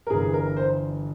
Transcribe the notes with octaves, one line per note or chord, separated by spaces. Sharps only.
A#4
G1 G2 E3 G#4
A#4
C5